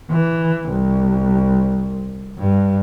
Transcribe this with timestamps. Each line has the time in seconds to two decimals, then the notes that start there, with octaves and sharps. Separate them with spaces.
0.11 E3
0.70 C2
2.38 G2